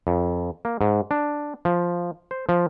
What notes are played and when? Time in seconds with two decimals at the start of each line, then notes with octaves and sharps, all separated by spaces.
0.07 F2
0.65 A#3
0.81 G#2
1.11 D4
1.65 F3
2.31 C5
2.49 F3